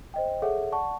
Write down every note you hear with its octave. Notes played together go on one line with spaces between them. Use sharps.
C5 D#5 G5
G#4 A4 C#5 E5 F#5
D5 F#5 A5 C#6